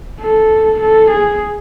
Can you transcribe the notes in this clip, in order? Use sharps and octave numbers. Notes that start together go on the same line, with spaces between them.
A4
A4
G#4